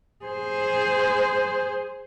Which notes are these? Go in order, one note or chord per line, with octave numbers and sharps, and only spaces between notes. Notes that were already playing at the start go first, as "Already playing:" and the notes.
G#4 C5